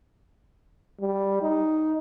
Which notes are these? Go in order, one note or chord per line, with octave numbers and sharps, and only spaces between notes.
G3
D#4